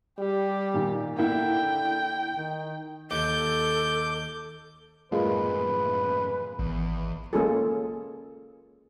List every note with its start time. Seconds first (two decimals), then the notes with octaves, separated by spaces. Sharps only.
0.19 G3 G4
0.74 A#2 D#3
1.18 D3 A#3 E4 F#5 G5
2.37 D#3
3.11 D#2 A4 D6 G6
5.12 F#2 A2 G#3 A#3 F4 B4
6.59 G#1 E2
7.33 G#3 A#3 C#4 F4 G#4 A4